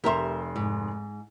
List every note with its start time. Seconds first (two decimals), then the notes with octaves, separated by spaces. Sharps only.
0.04 F1 G4 A#4 E5 C6
0.56 G#2